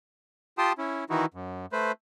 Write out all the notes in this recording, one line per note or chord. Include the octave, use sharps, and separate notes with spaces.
F4 G4 G5 A5 C6 D#6
C#4 E4
D#3 E3 D#4 E4 F#4
F#2
A3 B4 C5